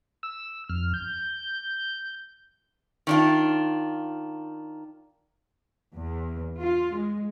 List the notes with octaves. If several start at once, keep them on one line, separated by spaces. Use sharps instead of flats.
E6
F2 F6
G6
D#3 D4 F4
E2
F4
G#3